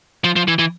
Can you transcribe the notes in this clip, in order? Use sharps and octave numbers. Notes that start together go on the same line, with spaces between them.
F3
F3
E3
E3